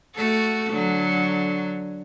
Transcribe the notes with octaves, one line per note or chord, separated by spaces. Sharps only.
A3 F#4 A4
D3 F#3